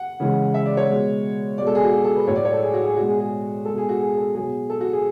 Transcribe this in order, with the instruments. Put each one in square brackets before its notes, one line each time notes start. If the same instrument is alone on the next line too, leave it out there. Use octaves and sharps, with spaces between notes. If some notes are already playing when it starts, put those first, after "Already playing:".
Already playing: [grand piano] F#5
C#3 E3 G#3
E5
D5
C#5
B2 G#3
B2 G#3 D5
A4
G#4
F#4
G#4
A4
B4
A2 F#3 C#5
D5
C#5
A4
G#4
F#4
G#4
B2 G#3 F#4
G#4
G#4
B2 G#3 A4
G#4
F#4
G#4
A4
B2 F#3 G#4
A4
F#4
G#4